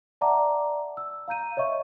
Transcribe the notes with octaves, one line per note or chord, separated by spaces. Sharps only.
D5 E5 F#5 A5 A#5 D6
E6
F5 A#5 G6 D#7
C#5 D#5 E5 C#6